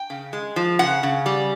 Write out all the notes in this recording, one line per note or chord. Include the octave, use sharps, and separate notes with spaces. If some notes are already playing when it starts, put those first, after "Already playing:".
Already playing: G5
C#3
G#3
F3
C#3 F#5
C#3
G3